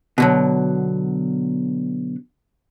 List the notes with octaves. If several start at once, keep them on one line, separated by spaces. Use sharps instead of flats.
B2 D3 F#3